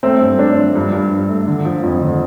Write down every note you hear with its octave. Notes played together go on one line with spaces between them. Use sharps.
A3 C4
G2
A3 D4
F3
G2
G2
G2
A3
D3
F3
F2
D3